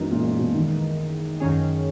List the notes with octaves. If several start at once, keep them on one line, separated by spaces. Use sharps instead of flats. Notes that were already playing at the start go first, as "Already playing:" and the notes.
Already playing: F#2 E3 G#3 B3 D#4 A#4
A#2
A#2
B2
D#3
F#2 D#3 F#3 C#4 G#4